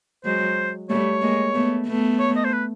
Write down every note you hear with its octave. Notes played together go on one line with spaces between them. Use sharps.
F#3 G#3 C5
G3 A3 C#5
G#3 A#3
A3 B3
A3 B3
C#5
D#5
C5
B4